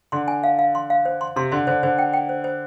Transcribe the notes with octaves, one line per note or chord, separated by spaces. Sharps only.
D3 C6
G#5
F5
F5
C6
F5
C5
C6
C3 C6
D3 C6
D3 C5
D3 C5
G5
G5
C5
C5